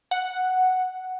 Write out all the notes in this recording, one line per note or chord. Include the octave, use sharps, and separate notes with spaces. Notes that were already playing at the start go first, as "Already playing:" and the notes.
F#5